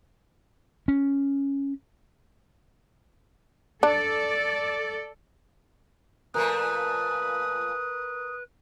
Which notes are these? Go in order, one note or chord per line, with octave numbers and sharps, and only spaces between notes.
C#4
D4 A4 D5
A#2 F3 A3 A#4 B4 A#5 D#6 F#6